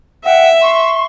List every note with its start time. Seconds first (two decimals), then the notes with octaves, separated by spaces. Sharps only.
0.24 E5 F#5 G5
0.61 C6 C#6